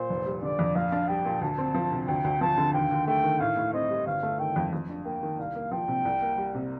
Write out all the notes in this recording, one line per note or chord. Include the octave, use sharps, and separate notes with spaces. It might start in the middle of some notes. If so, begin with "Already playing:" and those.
Already playing: A#2 C5
F1
G3
D3 D5
F2
A#1 F5
D4
G3 G5
A#2
D2 A5
C4
F3
C3
D2 G5
D2
F3 A5
D3
D#2 G5
D#2
A3 G5
D#3
A2 F5
A2
C4 D#5
G3
G1 F5
A3
D#3 G5
F2
F2
D4
A#3 G5
D#3
C2 F5
A#3
F3 G5
C3
C2
A#3
G3
C3